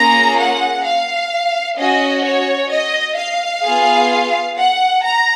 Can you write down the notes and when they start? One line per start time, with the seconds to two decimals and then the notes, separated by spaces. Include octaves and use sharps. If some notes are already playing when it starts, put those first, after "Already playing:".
Already playing: A#3 C#4 F4 G#4 A#5
0.39 F#5
0.85 F5
1.78 C#4 F#4 D#5
2.25 C#5
2.71 D#5
3.18 F5
3.64 B3 F4 G#4
4.57 F#5
5.03 A#5